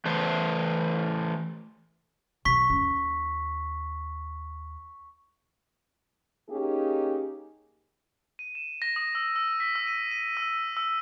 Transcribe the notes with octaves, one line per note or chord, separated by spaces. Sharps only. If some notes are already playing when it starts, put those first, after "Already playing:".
E3 A3 C5
B1 C#6 B6
D#2 C#4
A#3 C#4 D#4 G4 G#4
D#7
E7
A#6
D#6
E6
E6
B6
E6
D#7
D#7
E6
E6